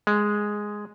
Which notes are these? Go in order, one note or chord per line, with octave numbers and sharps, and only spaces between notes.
G#3